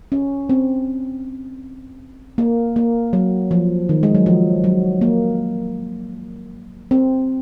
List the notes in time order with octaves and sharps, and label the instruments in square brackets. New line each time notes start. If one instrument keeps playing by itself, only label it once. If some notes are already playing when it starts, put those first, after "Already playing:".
[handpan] C#4
C4
A#3
A#3
F#3
F3
D#3
G#3
F#3
F3
F#3
A#3
C4